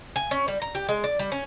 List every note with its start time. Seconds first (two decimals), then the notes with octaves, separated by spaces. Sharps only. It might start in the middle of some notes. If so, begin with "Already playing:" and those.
0.16 G#5
0.31 C#4
0.48 G3
0.62 A#5
0.75 G4
0.89 G#3
1.04 D5
1.19 G3
1.32 C#4